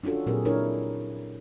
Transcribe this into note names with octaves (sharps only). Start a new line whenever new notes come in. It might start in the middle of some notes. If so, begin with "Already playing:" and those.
C#4 D4 F4 F#4 A4
A#2 F#3 C4 G4 G#4 A#4
D4 E4 A#4 C#5